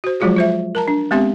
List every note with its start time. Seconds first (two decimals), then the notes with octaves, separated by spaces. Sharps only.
0.04 F#4 C5
0.20 F3 F#3 G#3 F4 F#4 G#4
0.36 F4 C5 E5
0.75 A#4 A5 A#5
0.88 D4
1.11 G#3 B3 C4 G4 E5 C6